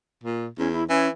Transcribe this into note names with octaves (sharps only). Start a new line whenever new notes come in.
A#2
E2 C#4
E4
E3 C#4